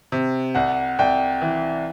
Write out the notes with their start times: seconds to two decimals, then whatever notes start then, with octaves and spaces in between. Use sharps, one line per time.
0.12 C3
0.55 C2 F#5
0.99 C2 G5
1.42 E3